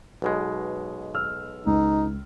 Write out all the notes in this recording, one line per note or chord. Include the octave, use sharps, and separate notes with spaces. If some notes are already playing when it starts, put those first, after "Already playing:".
B1 B2 G#3
E6 F6
C#2 D#4